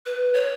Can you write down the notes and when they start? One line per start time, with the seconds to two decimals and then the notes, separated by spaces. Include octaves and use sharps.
0.06 B4
0.34 C#5